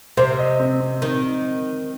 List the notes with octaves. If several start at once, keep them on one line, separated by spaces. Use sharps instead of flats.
C3 C5
C5
D#5
C4
C4
D#3 C4
D#4